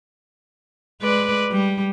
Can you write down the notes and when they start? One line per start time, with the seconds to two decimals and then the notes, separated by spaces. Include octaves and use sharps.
1.01 G#3 B4 D5
1.51 G3